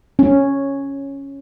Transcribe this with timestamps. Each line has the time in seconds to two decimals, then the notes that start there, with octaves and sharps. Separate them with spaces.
0.19 C#4